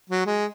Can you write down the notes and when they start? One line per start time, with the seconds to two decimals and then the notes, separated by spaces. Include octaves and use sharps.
0.10 F#3
0.26 G#3